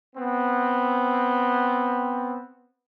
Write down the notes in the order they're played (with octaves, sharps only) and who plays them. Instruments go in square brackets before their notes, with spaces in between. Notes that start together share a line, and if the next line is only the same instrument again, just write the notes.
[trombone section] B3 C4